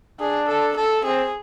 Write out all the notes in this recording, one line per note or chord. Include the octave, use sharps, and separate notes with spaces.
D4 G#4
A4
A4
C4 G#4